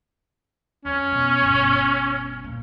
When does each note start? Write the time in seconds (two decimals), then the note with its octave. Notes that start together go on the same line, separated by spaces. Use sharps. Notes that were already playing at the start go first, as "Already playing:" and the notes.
0.85 F2 C#4
1.12 B2
1.42 G1 B2
2.44 A#2